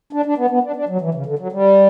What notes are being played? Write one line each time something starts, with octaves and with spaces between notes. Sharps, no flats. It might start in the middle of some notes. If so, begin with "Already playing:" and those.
D4
D4
B3
B3
D4
D4
F#3
E3
C#3
D3
F#3
G3